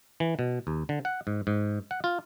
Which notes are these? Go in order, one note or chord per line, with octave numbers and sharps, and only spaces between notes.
E3
B2
D#2
D3
F#5
G#2
G#2
F#5
F4